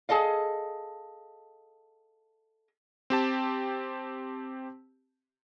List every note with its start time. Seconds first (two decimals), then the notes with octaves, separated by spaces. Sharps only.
0.09 G#4 A4 D#5 F5
3.10 C4 G4 A5